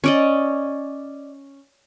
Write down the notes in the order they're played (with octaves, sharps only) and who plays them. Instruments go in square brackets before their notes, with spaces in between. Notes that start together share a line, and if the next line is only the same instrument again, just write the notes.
[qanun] C#4 D5 D#5